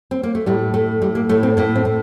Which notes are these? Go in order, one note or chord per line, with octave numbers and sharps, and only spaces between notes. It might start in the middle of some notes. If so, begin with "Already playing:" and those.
C4
A#3
A3
A2 G3
A2 A3
A2 G3
A#3
A2 A3
C4
A2 A#3
C4
A2